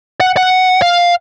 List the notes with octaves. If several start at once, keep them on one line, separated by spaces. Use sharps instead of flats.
F#5
F#5
F5